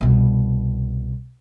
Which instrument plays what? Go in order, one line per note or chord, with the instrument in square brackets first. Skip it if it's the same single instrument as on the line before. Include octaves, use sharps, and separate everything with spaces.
[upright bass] C2 B2